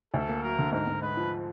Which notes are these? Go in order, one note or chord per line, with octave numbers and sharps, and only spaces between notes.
D2 A4
A#3
F#3 A#4
D3
G#2 A#4
G#2
G#3 B4
F3